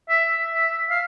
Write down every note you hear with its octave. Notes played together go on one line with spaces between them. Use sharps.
E5
E5
F5